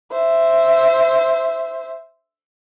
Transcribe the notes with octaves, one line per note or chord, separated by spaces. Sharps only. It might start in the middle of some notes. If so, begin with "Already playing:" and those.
C5 E5